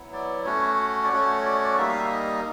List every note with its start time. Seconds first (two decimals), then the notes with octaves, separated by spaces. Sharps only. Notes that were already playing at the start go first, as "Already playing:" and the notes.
Already playing: F#3 B3 E4
0.13 D5
0.45 A3 C#4 F#4 C#5
1.04 D5
1.11 A3 C#4 F#4 C#5
1.45 D5
1.55 C#5
1.64 D5
1.77 G3 A#3 D#4 E5
1.89 F5
1.99 E5
2.10 D#5